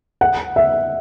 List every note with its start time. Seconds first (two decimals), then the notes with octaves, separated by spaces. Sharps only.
0.21 F#5
0.56 E5